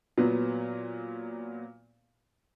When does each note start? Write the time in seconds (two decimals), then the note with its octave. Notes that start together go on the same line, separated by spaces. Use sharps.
0.17 A#2 F#3 B3